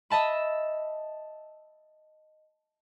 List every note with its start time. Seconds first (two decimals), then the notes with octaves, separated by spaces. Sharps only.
0.10 D#5 E5 A5 B5